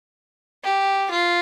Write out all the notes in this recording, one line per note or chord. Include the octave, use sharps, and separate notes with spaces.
G4
F4